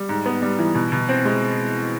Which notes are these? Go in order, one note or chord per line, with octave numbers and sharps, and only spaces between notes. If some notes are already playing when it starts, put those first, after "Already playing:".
Already playing: G3
G#2
B3
G3
E3
B2
B2
C4
G#3